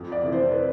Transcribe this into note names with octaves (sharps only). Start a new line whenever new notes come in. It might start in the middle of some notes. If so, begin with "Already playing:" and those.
Already playing: F2
D5
C3 E3
C5
B4